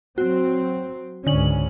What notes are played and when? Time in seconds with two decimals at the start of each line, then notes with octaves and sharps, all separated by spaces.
0.18 F#3 C4 F#4
1.27 C#2 G#2 D3 C#4 F#7